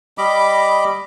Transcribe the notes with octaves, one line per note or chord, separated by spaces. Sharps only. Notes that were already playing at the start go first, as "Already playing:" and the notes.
G3 D#5 B5 D6